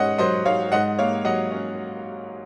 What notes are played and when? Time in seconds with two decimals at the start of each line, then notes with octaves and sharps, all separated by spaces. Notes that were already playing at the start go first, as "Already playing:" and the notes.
Already playing: G#2 C#4 D#5 F#5
0.18 F#3 C5 D#5
0.45 G#2 C#5 F5
0.72 G#2 D#5 F#5
0.99 A#3 C#5 F5
1.25 F#3 D#5 F#5
1.52 C#4